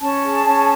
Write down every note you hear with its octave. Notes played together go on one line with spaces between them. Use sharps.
C#4 A5
G#4
C#4